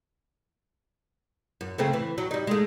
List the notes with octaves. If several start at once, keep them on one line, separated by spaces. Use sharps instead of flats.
F#2
C#3 A3 C4
E3
F#3
G3 D#4
G#3 A3